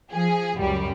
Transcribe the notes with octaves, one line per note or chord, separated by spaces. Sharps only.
F3 G#4
C#2 F#2 G3